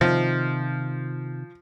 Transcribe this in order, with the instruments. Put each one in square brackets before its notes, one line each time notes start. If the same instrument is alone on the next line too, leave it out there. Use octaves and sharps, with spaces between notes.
[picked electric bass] C3 D#3 [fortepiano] F3